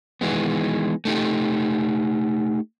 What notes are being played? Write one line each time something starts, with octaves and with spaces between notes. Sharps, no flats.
D#3 E3 G#3 B3
A3 D#4 G4